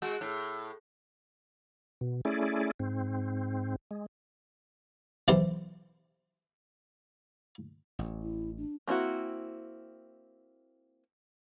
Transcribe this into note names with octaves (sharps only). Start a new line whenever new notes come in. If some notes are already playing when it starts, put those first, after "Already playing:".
G#3 F#4
A2
B2
A3 C#4 E4 G#4 D5
G#2 C4
G#3
B1 E3 E4 G4 A4 C5
A1
E4
D4
A#3 C4 E4 F#4